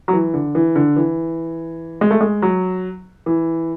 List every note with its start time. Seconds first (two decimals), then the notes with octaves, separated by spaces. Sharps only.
0.08 F#3
0.13 E3
0.34 D3
0.55 E3
0.76 D3
0.96 E3
2.01 G#3
2.11 A3
2.21 G#3
2.42 F#3
3.26 E3